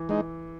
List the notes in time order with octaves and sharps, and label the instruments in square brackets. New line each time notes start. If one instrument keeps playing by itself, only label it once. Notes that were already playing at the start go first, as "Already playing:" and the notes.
Already playing: [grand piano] E3
[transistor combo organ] G#3 D#4